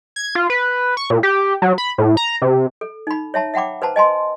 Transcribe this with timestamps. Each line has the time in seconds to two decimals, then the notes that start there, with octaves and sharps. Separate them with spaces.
0.16 G#6
0.35 F4
0.50 B4
0.97 C#6
1.10 A#2
1.23 G4
1.62 F#3
1.78 B5
1.98 A2
2.17 A#5
2.42 C3
2.81 A4
3.07 D#4 B5
3.34 C#5 E5 A5 A#5
3.54 E5 F#5 G5 B5 D6
3.82 B4 C5 A5 A#5
3.96 D#5 G#5 A5 C6